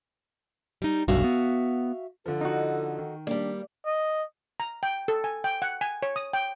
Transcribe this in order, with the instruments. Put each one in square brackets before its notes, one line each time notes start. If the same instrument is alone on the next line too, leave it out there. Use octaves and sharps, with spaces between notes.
[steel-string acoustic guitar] G3 D#4
[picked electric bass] F1 B1 G2 [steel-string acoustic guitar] F#4 E5 F5
[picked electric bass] B3
[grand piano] D3 F3 [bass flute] A4
[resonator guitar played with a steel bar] D#4 F#4
[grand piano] D#3
[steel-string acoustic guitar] G3 A#3 [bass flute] D4 [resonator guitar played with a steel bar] D5
[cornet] D#5
[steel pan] A#5
G5
A4
G#5
G5
F#5
G#5
C#5
D#6
G5